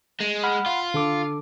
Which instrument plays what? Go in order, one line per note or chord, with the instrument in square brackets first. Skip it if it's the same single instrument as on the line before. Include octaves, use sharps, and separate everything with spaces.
[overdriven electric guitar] G#3
[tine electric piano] F#5 B5 F6
[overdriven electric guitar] F4
[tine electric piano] D3 A4 D6